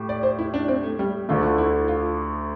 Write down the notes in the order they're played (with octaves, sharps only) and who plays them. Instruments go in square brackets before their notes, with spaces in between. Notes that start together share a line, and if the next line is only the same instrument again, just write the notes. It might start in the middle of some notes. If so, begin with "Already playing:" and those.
Already playing: [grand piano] A2 G4
[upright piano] D5
C5
E4
D4
C4
A3
G3
[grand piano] D2 D3 A3 [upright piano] F4
[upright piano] E4
F4